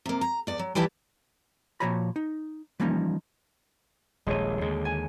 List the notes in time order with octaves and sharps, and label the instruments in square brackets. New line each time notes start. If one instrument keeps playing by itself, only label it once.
[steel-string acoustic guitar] C3 A#3
A#5
E2 D5
F#3
E3 G3 E4 G4 B4 A5
[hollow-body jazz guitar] A#2 F3 F#4 C#5 A#5 B5
D#4
E3 F3 G3 A#3 C#4 D#4
[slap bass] D#1 A#1 [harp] G#3 C#5 D#7
[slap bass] D#2 D3 [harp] G#3
[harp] G#5